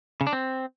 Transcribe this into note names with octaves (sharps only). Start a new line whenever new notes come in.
C#3
D4
C4